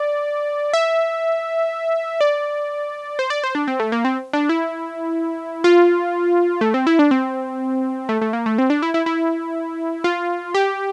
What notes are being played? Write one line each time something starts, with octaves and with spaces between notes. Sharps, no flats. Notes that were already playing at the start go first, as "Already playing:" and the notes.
Already playing: D5
E5
D5
C5
D5
C5
D4
C4
A3
A#3
C4
D4
E4
F4
A3
C4
E4
D4
C4
A3
A3
A#3
A3
C4
D4
E4
E4
E4
F4
G4